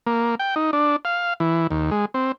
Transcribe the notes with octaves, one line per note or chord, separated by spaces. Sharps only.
A#3
G5
D#4
D4
F5
E3
D#2
G#3
C4